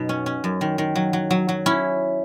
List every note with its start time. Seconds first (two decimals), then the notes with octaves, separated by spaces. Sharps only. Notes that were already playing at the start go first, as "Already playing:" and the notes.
Already playing: F#2 B2 D#4
0.09 C#4
0.26 C#4
0.44 F#2
0.61 D#3
0.78 D#3
0.96 F#3
1.13 F#3
1.31 F#3
1.49 F#3
1.66 C#4 E4